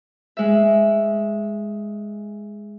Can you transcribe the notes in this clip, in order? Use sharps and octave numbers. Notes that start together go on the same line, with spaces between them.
G#3 E5